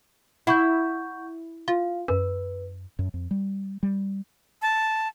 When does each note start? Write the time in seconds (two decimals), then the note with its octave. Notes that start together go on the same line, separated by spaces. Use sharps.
0.47 E4 F#5 C#6 G6
1.68 F4 F5
2.08 F#2 B4
2.99 F#2
3.14 F2
3.31 G3
3.83 G3
4.62 A5